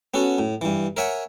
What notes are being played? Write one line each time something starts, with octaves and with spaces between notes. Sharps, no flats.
B3 C#4 F#4 A4
A2
G2 E3
A#4 C#5 E5 F#5 G#5